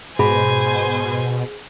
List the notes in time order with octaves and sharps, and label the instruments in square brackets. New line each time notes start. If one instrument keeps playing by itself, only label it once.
[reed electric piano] G#2 B5 [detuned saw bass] B2 [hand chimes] G#4 [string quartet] C5 G#5